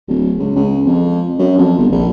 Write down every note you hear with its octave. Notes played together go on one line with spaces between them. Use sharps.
D1
C#2
C#2
F2
F#2
F2
G1
A#1